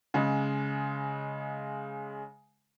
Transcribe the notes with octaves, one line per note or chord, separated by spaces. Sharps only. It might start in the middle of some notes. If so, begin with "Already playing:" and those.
C#3 G#3